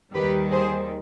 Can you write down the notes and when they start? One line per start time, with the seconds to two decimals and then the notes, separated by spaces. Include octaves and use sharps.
0.15 D#2 D#3 G3 G4 B4
0.52 G#4 C5